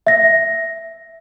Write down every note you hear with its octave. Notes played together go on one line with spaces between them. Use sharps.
E5 A#6